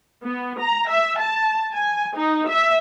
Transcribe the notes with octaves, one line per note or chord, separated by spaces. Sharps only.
B3
A#5
E5
A5
G#5
D#4
E5